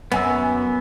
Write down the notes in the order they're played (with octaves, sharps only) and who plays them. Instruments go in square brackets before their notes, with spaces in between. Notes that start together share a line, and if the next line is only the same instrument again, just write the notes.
[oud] F#2 [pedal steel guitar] B3 G#5 E6